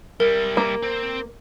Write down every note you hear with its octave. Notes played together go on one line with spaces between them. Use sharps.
G3 E4 A#4
A#3
C4 C5